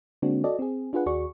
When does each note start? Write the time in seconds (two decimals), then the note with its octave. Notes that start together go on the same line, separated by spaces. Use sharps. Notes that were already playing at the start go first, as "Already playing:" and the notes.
0.22 D3 G#3 A#3 C4 D4 F#4
0.44 F#4 A4 D5 D#5
0.59 C4 G#4
0.93 D4 F4 G#4 B4 F#5
1.06 D#2 F#4 G#4 D5 C#6